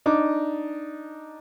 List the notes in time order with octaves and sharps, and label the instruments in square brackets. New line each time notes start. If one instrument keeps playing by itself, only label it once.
[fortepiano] D4 D#4 D6